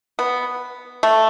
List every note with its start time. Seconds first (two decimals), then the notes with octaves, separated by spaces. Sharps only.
0.19 B3
1.03 A3